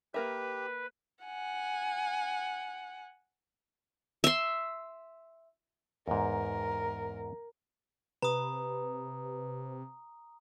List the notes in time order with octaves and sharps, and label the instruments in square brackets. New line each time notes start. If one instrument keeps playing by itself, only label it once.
[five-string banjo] A#3 A#4 E5 [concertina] G4 [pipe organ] B4
[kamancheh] F#5 G#5
[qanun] E5 C6
[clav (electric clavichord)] E2 G#2 [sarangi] A#4
[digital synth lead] C3 [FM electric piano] B4 [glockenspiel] A#5 D#6